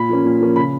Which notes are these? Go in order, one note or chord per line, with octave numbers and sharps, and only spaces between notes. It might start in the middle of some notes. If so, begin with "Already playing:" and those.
Already playing: A#2 B5
F3 A#3 C#4
A#2
F3 A#3 C#4
C#3 B5